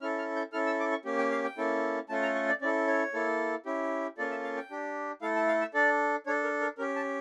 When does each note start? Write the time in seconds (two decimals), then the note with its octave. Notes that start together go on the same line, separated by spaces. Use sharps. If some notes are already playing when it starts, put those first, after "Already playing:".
0.01 C#4 E4 A4 F6
0.18 F6
0.36 G6
0.53 C#4 E4 A4 F6
0.66 E6
0.80 D6
0.92 C#6
1.05 A#3 C#4 G4
1.18 G5
1.31 F5
1.44 G5
1.58 A#3 C#4 E4 A4
2.09 A3 C#4 F4 A4 A5
2.22 A#5
2.35 C#6
2.49 D5
2.61 C#4 E4 A4 D5
2.87 C#5
3.14 A#3 E4 A4
3.66 C#4 E4 G4
4.18 A#3 C#4 F4 A4 D5
4.31 E5
4.43 F5
4.57 G5
4.70 D4 G4
5.22 A3 E4 A4 F5
5.36 A5
5.48 F5
5.61 E5
5.74 D4 A4 D5
6.26 D4 A4 C#5
6.43 A#4
6.61 A#4
6.78 C#4 G4 A#4
6.96 A5